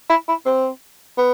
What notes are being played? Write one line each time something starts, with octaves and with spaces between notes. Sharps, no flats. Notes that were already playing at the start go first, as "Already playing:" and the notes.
E4
E4
C4
B3